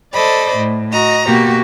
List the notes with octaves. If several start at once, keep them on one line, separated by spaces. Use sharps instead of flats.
A4 C5 D5 D#5 B5
A2
F#4 D#5 A#5
B2 A#3 F#4 G4